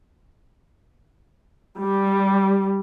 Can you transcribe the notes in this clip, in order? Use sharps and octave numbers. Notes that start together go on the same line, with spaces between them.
G3